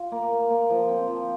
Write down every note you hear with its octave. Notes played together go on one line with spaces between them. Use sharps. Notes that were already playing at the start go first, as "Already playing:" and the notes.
Already playing: F4
A#3
A#3
A#3
F3
C4
F3